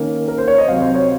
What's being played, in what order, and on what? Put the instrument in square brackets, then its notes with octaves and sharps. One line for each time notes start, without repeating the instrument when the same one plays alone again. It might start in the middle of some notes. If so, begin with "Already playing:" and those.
Already playing: [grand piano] D#3 A#3 C#4
A#4
C5
C#5
D#5
C3 F#3 C4 F5
C5
C#5